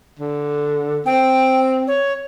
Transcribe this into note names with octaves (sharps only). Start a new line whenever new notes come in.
D3
C4 G5
C#5